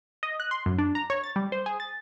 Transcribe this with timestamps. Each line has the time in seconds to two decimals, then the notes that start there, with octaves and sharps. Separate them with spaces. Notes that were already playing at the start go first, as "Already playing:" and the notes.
0.23 D#5
0.40 F#6
0.51 C6
0.66 F#2
0.78 D4
0.95 A#5
1.10 C#5
1.24 A6
1.36 G3
1.52 C5
1.66 G#4
1.80 A6